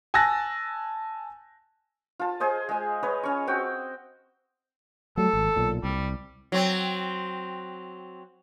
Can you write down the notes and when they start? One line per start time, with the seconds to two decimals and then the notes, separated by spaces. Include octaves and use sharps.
0.14 G#5 A5 E6 F#6 A6 A#6
2.20 F4 A5
2.40 G#4 C5 D#5
2.69 G#3 G#5
3.03 B4 C#5 D#5
3.23 C#4 C#6
3.47 C4 F#4 G5
5.17 F#3 G3 A3 A4
5.33 G#1
5.56 B1 A#2
5.83 C2 G3
6.52 F#3 C4